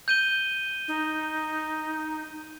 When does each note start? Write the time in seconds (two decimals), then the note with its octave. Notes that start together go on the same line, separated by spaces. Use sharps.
0.08 G6 D#7 G7
0.88 D#4